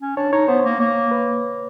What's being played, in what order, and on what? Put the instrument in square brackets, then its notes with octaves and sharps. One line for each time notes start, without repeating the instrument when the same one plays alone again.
[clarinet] C#4
[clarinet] D4 [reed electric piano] C#5
[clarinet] D#4 [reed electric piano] C#5
[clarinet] B3 [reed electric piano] C5
[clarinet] A#3
[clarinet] A#3 [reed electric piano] C#5
[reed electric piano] B4